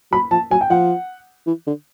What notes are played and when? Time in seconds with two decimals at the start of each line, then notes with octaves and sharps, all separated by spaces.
0.12 F#3 B5
0.31 F3 A5
0.51 F#3 G#5
0.61 G5
0.70 F3 F#5
1.47 E3
1.67 D3